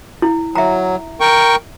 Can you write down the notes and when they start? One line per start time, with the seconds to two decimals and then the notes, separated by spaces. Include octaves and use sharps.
0.22 E4
0.55 F#3 E5 A#5
1.21 A#4 G5 C#6